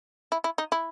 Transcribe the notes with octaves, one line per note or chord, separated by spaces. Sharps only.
E4
E4
D#4
E4